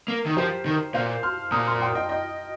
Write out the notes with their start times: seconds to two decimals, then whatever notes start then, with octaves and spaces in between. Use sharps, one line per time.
0.08 A#3
0.26 D#3 A#4
0.37 F3 G4 C5
0.66 D#3
0.94 A#2 C5 F5
1.23 C6 F6
1.52 A#2 A#5 D#6
1.66 C6 F6
1.80 G5 C6
1.95 D#5 G5
2.09 D#5 G5